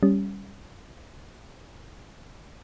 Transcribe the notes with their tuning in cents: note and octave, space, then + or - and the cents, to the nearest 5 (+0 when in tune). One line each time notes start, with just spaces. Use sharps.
G3 +5 C#4 +0